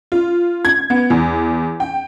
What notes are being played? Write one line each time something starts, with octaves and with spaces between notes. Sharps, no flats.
F4
G#6
B3
E2
G5